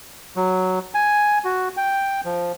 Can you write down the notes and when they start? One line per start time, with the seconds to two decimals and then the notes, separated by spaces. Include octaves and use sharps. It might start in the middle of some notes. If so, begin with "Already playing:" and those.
0.36 F#3
0.94 G#5
1.45 F#4
1.77 G5
2.25 F3